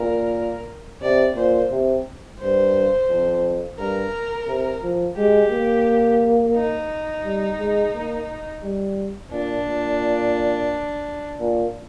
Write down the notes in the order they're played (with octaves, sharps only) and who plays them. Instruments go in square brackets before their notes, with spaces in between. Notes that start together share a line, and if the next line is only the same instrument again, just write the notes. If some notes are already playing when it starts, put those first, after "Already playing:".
Already playing: [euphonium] A#2 [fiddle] A#4
[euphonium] C3 [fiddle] D5
[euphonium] A#2 [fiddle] C5
[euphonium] C3
[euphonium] G2 [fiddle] C5
[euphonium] F2
[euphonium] G2 [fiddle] A#4
[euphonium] C3
F3
[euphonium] G#3 [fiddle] G4
[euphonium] A#3
[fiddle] D#4
[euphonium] G3
G#3
A#3
G3
[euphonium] A#2 [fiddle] D4
[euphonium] A#2
A#2